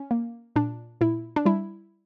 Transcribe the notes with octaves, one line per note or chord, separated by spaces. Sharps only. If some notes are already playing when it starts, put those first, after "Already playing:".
Already playing: C#4
A#3
A#2 D4
A#2 E4
D4
G3 E4